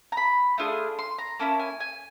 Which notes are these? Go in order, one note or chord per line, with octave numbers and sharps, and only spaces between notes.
A#5
B5
A3 D4 F4 G#4
C6
A#5
A#3 C#4 E4 A5
G#5
G#5